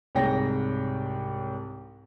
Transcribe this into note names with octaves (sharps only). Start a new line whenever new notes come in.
C2 G#2 C#5 G5 A#6